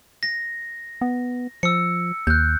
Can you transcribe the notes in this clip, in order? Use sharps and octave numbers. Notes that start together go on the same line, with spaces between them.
A#6
B3
F3 E6 C#7
D#2 F#6 G6